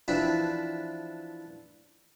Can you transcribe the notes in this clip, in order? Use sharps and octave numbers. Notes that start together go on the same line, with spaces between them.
E3 F3 C4 D4 B4 B5